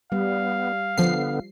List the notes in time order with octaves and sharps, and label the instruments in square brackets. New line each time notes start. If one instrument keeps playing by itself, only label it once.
[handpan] G3 [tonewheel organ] B3 [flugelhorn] F5
[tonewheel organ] D3 B3 [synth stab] F3 C7